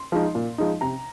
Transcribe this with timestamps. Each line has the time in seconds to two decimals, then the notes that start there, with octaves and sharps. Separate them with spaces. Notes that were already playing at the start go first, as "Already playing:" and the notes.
Already playing: C6
0.12 F3 G#3 D#4
0.35 A#2
0.58 F3 G#3 D#4
0.81 C3 A#5